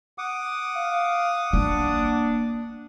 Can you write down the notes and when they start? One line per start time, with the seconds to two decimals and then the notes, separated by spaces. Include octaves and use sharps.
0.18 F#5 D6 D#6
0.76 F5
1.53 A#3 D4